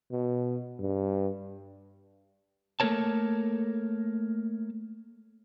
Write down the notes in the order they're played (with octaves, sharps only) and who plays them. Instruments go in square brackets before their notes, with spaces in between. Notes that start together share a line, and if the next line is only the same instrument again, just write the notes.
[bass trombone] B2
G2
[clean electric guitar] A3 A#3 A4 A#4 C#5 A5